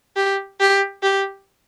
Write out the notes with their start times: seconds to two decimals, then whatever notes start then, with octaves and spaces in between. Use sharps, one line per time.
0.16 G4
0.61 G4
1.03 G4